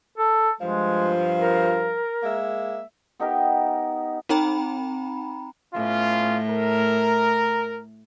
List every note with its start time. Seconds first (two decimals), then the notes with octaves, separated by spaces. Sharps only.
0.18 A4
0.61 G2 F3 G#3
1.40 A#4
2.22 G#3 A#3 E5
3.20 B3 D#4 G4 A#4
4.29 C4 D#4 G5 A#5 B5
5.74 A2 B3 C#4 F4
6.49 A#4